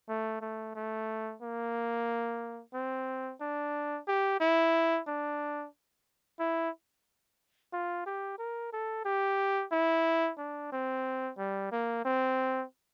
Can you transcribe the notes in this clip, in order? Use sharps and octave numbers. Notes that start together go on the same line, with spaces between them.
A3
A3
A3
A#3
C4
D4
G4
E4
D4
E4
F4
G4
A#4
A4
G4
E4
D4
C4
G3
A#3
C4